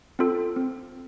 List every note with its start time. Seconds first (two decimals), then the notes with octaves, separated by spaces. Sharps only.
0.19 C4 F4 A4
0.56 C4